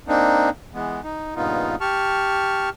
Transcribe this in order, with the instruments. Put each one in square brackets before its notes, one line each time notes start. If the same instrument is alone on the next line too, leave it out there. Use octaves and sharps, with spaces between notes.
[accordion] A#3 C4 D4 D#4
E3 G#3 B3
D#4
G2 A#2 C#3 B3 D#4 F4
G4 A5 C#6 F6